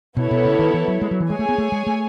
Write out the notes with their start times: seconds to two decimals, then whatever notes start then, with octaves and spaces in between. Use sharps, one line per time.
0.17 B2 B3 E4 A4 C#5
0.31 B2
0.45 C#3
0.59 D#3
0.74 E3
0.88 F#3
1.02 G#3
1.11 F#3
1.20 E3
1.30 G#3 G#4 C#5 G#5
1.39 A3
1.49 B3
1.58 A3
1.72 G#3
1.87 A3